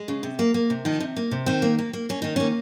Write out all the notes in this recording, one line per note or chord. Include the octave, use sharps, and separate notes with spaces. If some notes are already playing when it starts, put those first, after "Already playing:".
Already playing: G#3
C#3
C3
A#3
A#3
C3
D#3 F3 D#4
C3
A#3
C3
D#3 C4
A#3
A#3
A#3
A#3 C#4
D#3 D#4
A#3 C#4